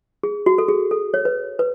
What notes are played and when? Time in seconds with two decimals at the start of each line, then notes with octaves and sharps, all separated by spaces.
0.23 G#4
0.46 F#4
0.58 A4
0.68 G#4
0.91 A4
1.14 C#5
1.25 B4
1.59 B4